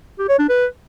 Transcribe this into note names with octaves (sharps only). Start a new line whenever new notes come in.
G4
C#5
D4
B4